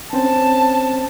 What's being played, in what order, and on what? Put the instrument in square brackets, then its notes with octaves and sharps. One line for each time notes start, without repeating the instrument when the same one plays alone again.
[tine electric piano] C4 C#4 C5 [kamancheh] A5